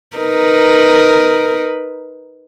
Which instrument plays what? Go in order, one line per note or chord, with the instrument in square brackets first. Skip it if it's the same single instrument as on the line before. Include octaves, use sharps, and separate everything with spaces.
[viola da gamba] D#4 A#4 B4